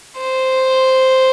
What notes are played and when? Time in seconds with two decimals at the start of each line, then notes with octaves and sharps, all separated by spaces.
0.17 C5